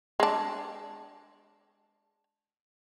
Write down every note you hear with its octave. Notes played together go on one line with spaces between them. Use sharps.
G#3 D4